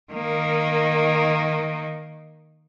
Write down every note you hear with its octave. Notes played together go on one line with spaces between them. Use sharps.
D#3 A#3